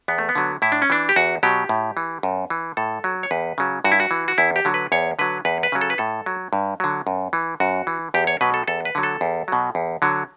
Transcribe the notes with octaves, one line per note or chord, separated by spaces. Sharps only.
E2 B3
A3
B3
D3 F#3
A2 E4
D4
C#4
E3 D4
G4
E2 F#4
B2 F#3 G4
A2
E3
F#2
E3
A2 A4
F#3
C#5
E2 B4
C#3 F#3
G2 F#4
E4
F#4
E3
F#4
E2 E4
G4
D3 F#3
B4
E2 C#5
D3 F#3 B4
E2 B4
B4
C#3 F#3
A4
B4
A2 A4
F#3
G2
D3 F#3
F#2
E3
F#2 F#4
E3
E2 G4
C#5
B2 F#3 B4
A4
E2 A4
B4
D3 F#3
A4
E2
B2 F#3
E2
D3 F#3